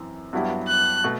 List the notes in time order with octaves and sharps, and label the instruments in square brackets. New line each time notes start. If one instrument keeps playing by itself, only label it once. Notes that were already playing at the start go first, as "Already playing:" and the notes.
Already playing: [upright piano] F#2 E3 C4
G2 F#3 B3 E4 G4
[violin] F#6
[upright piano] B2 A3